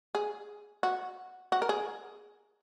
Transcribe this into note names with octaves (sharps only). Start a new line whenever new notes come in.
G#4
F#4
F#4
A#4
G#4